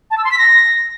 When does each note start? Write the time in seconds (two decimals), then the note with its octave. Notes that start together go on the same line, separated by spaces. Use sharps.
0.11 A5
0.18 E6
0.25 C6
0.31 B6
0.38 A#6